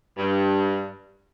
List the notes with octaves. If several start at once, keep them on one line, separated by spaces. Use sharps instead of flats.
G2